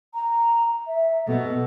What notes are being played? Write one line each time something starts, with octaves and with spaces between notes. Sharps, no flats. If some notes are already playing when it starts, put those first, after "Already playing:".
A#5
E5
B2 A4